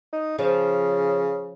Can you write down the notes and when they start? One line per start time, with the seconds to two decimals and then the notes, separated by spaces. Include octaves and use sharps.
0.13 D#4
0.39 C#3 F3